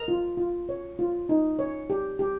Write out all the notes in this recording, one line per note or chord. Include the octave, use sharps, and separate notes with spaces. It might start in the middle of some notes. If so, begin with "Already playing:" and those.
Already playing: A#4 A#5
F4
F4
C#5
F4
D#4
C#5
G4
G4